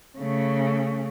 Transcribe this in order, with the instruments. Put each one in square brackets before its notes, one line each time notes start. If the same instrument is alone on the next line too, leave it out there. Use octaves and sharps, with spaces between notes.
[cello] C#3 A3